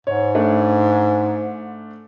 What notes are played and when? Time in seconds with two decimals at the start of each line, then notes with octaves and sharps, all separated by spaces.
0.07 G#2 C#5
0.35 A3 D4